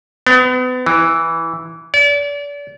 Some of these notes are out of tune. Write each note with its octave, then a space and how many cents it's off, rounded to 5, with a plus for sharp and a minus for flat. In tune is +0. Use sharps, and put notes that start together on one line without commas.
B3 +35
E3 -5
D5 -35